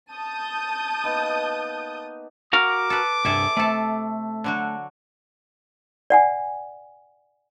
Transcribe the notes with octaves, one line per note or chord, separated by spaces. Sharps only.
A5 D#6 G6
A#3 B3 D#4
F#4 A#4 F5 D6
A4 B4
C2 G2 G#4 A4 E5
C3 A3 A4
D3 F#3 F#4
D5 F#5 G#5